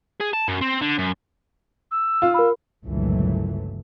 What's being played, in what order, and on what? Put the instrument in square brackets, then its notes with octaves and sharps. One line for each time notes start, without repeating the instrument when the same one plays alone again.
[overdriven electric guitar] G#4
A5
F#2
C4
D3
F#2
[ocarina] E6
[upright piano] F4
[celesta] A#4 B5 [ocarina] E6
[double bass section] G1 C#2 A#2 E3 F#3 A3